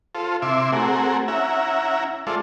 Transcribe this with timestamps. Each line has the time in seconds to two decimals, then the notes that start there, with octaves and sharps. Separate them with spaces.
0.15 F4 A4 C5
0.42 C3 E4 E5 C6 D6
0.72 A3 C4 F#4 G#4 A#4
1.28 C#4 E4 E5 F#5 A#5
2.27 G#3 F4 A4 C5 D5 E5